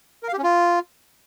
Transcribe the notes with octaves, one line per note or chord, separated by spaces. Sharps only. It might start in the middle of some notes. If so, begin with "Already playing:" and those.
A#4
F5
G4
C#4
F4